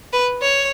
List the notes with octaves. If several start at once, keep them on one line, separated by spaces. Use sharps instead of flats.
B4
C#5